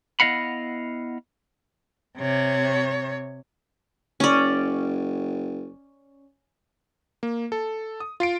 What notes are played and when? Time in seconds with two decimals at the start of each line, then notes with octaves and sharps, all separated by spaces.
0.20 B3 E4 D#5 F5 F#5 B5
2.18 C3 C#5
4.20 F#1 C#4 D5
7.23 A#3
7.52 A4
8.00 D#6
8.20 F4 C7 D7